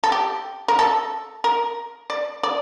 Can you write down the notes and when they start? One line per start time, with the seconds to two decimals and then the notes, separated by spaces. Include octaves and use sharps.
0.04 A4
0.12 G4
0.68 A#4
0.79 A4
1.44 A#4
2.10 D5
2.43 D5